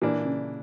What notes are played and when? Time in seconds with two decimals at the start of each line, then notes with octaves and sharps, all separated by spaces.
0.02 A#2 E3 A#3 D4
0.25 C#3